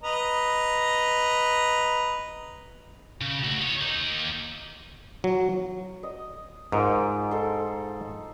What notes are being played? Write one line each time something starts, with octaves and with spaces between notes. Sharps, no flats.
B4 D#5 A#5
C#3
A3 F#4
D#4 C#5
A#3 D#4
F#3
D#5
G#2 D#4 F4 A#4
D#4 A4 C6